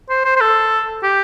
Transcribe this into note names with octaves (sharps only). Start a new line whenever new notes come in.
C5
C5
C5
A4
G4